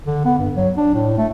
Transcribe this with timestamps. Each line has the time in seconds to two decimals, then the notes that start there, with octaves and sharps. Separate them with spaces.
0.06 D3
0.25 B3
0.39 G2
0.57 F#3
0.77 D4
0.95 A2
1.18 A3